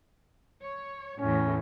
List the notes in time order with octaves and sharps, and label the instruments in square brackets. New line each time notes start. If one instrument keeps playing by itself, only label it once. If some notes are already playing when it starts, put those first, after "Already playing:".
[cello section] C#5
[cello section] E2 A2 [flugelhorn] C#4